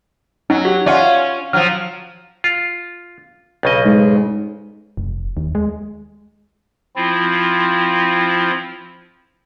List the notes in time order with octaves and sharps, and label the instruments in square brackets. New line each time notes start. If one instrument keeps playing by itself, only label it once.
[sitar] F#3 [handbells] C#4 D#4
[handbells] F#4 G4
[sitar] C#4 F4 [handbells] D5 E5 F#5
[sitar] F3 F#3 [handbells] F6
[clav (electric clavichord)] F4
B1 C#3 D#5
[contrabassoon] G#2
[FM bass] F1
D#2
G#3
[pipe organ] F3 C4 E4 F4